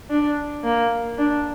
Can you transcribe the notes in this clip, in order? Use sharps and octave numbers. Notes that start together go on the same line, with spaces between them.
D4
A#3
D4